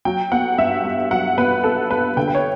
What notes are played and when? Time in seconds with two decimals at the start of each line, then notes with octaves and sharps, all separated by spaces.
0.05 F#3 G5
0.32 B3 F#5
0.58 G2 E5
0.85 G2
1.11 F#3 F#5
1.38 B3 B4
1.64 G2 A4
1.91 G2 B4
2.17 D3 G5
2.28 B4
2.35 C#5